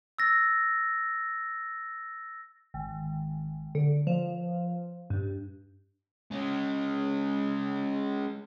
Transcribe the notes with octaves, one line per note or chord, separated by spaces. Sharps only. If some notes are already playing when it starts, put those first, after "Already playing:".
E6 A6 A#6
G#1
D3
F3
G2
G#3 C#4